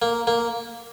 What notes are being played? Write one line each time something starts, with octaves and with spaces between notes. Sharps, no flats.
A#3
A#3